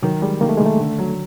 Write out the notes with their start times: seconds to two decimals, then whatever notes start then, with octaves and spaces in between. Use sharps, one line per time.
0.02 D#3 F#3
0.22 G3 G#3
0.41 D#3 A#3
0.49 A3
0.57 D#3 G#3
0.66 A3
0.79 D3
0.99 F#3